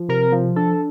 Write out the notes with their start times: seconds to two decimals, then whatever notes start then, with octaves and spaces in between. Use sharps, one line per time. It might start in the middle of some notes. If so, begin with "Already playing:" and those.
Already playing: F3
0.08 C3 A#4
0.32 F3
0.56 D4 A4